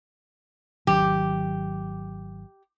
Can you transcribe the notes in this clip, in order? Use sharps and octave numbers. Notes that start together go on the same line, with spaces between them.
G#1 D#3 F#3 G4